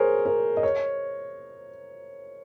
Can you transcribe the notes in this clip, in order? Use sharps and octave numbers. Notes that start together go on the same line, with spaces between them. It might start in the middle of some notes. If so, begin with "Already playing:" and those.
Already playing: G#4 A#4 C5 C#5
A#4
D#5
C#5